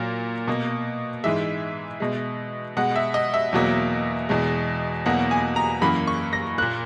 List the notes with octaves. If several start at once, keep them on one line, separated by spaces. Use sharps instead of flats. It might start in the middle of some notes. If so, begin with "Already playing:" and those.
Already playing: A#2 F#3 A#3
B2 A#3
G#2 E3 G#3 E5
B2 G#3
B2 G#3 F#5
E5
D#5
E5
E2 B2 F#3 A#3
E2 B2 G#3
E2 B2 F#3 A#3 F#5
G#5
A#5
F#2 E3 A#3 B5
C#6
A#6
A#2 A#3 F#6